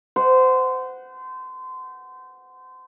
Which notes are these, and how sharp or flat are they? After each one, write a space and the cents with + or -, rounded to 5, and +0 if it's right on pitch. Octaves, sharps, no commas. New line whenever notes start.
C5 -25 F#5 +0